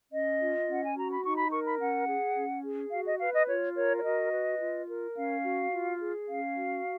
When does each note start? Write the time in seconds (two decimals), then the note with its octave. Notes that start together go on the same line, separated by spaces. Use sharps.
0.12 C#4 D#5
0.39 F4
0.67 C#4
0.73 F#5
0.84 G#5
0.96 F#4 A#5
1.11 B5
1.24 D#4 C#6
1.38 B5
1.51 A#4 C#6
1.65 B5
1.79 C#4 F#5
2.08 G#4
2.35 C#4
2.63 G#4
2.91 F#4 F5
3.06 D#5
3.19 B4 F5
3.34 D#5
3.48 F4 C#5
3.75 A#4 C#5
3.98 C#5
4.03 F#4 D#5
4.32 B4
4.60 F4
4.88 A#4
5.16 C#4 F5
5.44 F#4
5.72 F4
5.99 G#4
6.28 C#4 F5
6.56 F#4